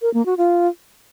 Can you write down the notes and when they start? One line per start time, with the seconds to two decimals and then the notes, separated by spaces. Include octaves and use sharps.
0.02 A#4
0.14 A#3
0.26 F#4
0.38 F4